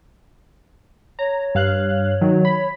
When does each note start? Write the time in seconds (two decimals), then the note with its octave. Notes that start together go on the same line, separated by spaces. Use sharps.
1.19 C#5 A#5
1.55 G2 F5 F#6
2.21 D#3 F#3
2.45 B5